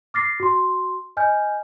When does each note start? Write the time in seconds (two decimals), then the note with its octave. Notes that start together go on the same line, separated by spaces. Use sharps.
0.14 D6 F6 A6 A#6 C7
0.40 F#4 C6
1.17 D#5 G#5 F6 G6